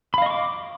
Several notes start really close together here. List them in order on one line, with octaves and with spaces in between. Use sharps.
B5 F5 D#5 C#6 D6